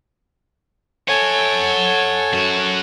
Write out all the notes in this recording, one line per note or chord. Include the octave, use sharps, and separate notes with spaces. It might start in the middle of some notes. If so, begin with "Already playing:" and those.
A4 C#5 F#5 G#5
F#2 F#4